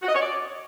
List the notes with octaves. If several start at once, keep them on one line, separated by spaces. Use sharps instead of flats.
F#4
D#5
C#5
D5